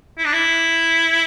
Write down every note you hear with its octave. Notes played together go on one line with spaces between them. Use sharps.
E4
D4
E4